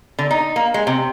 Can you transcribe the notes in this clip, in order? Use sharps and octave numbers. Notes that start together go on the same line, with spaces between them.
D3
D#4
A#3
G#3
C3